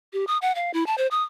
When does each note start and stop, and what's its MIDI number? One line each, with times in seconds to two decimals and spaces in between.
0.13 0.27 67
0.27 0.38 87
0.42 0.54 78
0.55 0.71 77
0.74 0.86 64
0.87 0.95 81
0.98 1.07 72
1.11 1.23 87